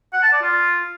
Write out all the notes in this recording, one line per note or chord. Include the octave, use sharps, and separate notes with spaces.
F#5
A5
D5
F4